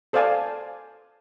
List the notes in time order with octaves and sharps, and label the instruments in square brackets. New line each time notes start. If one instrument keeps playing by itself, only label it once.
[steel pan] A4 C5 D5 F5 G#5 A5